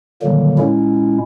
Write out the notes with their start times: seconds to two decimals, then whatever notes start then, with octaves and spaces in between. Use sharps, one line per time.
0.22 A#2 D3 D#3 F#3 G3 A#3
0.58 A#2 G#3 C#4 E4